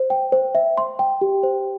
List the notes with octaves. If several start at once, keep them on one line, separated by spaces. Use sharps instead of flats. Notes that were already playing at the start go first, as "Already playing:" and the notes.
Already playing: C5
G5
C5
E5
C6
G5
G4
C5